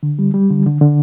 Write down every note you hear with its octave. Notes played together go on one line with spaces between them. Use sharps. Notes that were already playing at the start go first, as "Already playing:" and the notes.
D3
G3
G3
D3
D3
D3